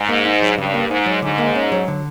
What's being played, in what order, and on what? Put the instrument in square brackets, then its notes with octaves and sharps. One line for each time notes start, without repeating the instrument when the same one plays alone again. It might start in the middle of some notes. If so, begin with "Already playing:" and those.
Already playing: [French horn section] G#2
[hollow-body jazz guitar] A#3
D#4
F#3
[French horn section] G2 [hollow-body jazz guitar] C#3
[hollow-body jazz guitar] A#3
[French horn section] G#2 [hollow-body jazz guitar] D#4
[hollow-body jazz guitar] F#3
[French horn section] G#2 [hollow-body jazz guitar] D3
[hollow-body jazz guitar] A#3
C#4
F#3
D3